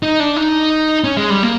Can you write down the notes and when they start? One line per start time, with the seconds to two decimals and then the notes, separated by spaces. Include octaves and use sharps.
0.03 D#4
0.20 D4
0.36 D#4
1.04 C#4
1.17 G#3
1.30 G3
1.43 A#3